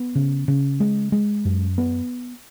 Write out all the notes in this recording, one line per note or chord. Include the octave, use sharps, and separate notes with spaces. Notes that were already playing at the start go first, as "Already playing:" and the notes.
Already playing: B3
C#3
C#3
G#3
G#3
F#2
B3